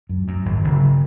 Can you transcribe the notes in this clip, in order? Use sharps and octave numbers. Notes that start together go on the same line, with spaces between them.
F#2
F#2
G#1
F#1